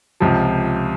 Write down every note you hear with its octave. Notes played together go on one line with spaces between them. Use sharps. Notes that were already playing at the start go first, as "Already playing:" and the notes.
C#2 C3 F3